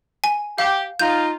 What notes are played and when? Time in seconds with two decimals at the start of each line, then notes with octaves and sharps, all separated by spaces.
0.24 G#5
0.58 G4 F5
0.99 D#4 F4 G6